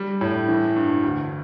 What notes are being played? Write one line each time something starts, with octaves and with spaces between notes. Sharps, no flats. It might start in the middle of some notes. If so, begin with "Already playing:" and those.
Already playing: G3
A2
E3
G2
D2